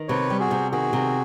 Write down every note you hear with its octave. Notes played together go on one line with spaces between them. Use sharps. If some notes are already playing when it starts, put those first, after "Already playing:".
Already playing: D#3
C3 B4 C#5
G3 G4
F#4 G#4
C3
D#3 F#4 G#4
C3